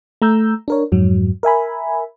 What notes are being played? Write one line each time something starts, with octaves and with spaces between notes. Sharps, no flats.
A3 A#5 E6 G6
D4 A#4 C#5
F2 G#2 F#3
A#4 E5 G#5 B5